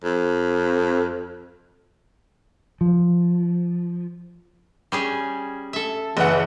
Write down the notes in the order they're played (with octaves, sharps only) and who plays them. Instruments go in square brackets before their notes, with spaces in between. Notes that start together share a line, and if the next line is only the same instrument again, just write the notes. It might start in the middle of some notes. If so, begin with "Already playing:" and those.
[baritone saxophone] F2
[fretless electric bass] F3
[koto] G3 C#4 G#4
A4 E5
[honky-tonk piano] F#1 F#5 [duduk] E3